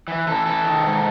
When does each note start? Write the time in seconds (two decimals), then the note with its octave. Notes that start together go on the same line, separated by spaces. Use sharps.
0.08 E3
0.27 E3 A4
0.46 E3 A4
0.64 D#3
0.83 G#2